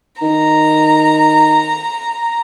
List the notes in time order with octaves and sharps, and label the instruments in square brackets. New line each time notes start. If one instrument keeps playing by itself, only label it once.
[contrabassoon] D#3 [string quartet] A#5